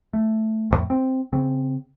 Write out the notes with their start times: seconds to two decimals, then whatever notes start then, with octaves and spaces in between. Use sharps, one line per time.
0.13 A3
0.71 A1 F2 A2
0.90 C4
1.32 C#3 C4